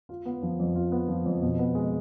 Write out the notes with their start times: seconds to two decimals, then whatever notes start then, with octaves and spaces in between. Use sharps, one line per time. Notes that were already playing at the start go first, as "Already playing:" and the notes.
0.09 F4
0.25 B3
0.43 F3
0.60 F2
0.76 F4
0.92 B3
1.08 F3
1.26 F2
1.42 B2
1.59 B3
1.75 G#3